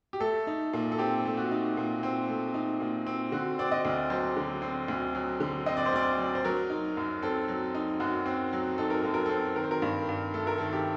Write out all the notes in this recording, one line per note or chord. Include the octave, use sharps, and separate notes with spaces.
G4
A3 A4
D#4
A#2
A4
C4 G4
A3
F#4
D#4
A#2
C4
A3
D#4
A#2
C4
D3 F#4
C4 D5
D#5
D2
F#3 C5
D3
C4
D2
F#3
D3
C4 D#5
D5
C5
D2 D5
F#3
C5
F#3 A#4
D#4
F#2
C4 A4
F#3
D#4
F#2 F#4
C4
F#3
D#4 A4
A#4
F#2 A4
A#4
C4 A4
D#3 A#4
C5
A#4
G2
G2
A3 A4
A#4
D#3 A4
G4